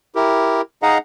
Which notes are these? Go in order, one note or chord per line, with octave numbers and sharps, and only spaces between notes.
E4 G4 A#4
D#4 G#4 D#5 F5 F#5 A#5